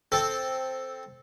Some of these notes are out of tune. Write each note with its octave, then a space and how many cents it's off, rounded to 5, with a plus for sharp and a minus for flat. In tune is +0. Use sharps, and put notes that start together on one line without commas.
C4 +0 A4 +0